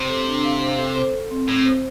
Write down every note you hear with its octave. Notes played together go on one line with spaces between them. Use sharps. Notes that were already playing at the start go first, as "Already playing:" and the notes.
Already playing: C3 C5
A4
D4
F5
C5
A4
C5
A4
C4
A2 C4
C5